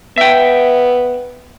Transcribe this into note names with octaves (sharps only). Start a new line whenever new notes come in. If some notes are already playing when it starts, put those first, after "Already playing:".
B3 E5 G5